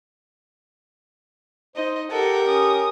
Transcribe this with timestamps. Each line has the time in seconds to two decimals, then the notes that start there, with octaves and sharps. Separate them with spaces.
1.76 D#4 C5 D#5
2.12 G4 A4 A#4 F#5
2.48 C#4 D#6